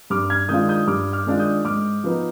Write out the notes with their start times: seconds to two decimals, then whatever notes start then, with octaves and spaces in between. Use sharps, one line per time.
0.10 G2 D6 F6
0.30 F6 G#6
0.49 D#3 G#3 D4 F4 D#6 G6
0.69 D#6 G6
0.87 G2 D6 F6
1.13 D6 F6
1.26 D#3 G#3 D4 F4
1.39 D#6 G6
1.65 G#2 D6 F6
2.04 F3 B3 D#4